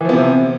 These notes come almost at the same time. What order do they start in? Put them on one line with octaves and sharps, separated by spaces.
E3 F3 B3 C3 C4